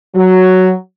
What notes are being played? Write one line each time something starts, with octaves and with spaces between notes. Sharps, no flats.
F#3